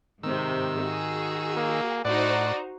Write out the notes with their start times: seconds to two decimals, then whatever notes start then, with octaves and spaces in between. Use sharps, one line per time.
0.23 G#2 C3 D#3 E6
0.81 F#4 G#4
1.56 A#3
2.05 A2 D#4 F#4 C5 D5 F#5